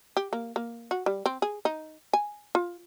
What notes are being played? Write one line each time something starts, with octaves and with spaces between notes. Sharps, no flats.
G4
A#3
A#3
F#4
G3
C4
G#4
D#4
G#5
F4